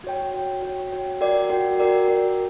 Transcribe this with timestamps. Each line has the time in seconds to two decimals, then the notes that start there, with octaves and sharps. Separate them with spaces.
0.04 F#4 C#5 G5
0.33 F#4 C#5 G5
0.62 F#4 C#5 G5
0.91 F#4 C#5 G5
1.21 F#4 A#4 D5 G5
1.50 F#4 A#4 D5 G5
1.78 F#4 A#4 D5 G5
2.08 F#4 A#4 D5 G5